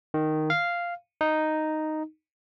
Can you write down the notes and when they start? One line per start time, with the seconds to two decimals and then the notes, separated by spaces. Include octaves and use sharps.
0.14 D#3
0.50 F5
1.21 D#4